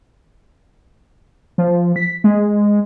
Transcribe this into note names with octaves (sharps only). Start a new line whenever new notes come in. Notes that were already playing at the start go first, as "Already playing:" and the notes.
F3
B6
G#3